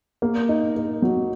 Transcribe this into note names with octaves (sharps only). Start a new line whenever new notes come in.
A#3
D#4
A#3
F#3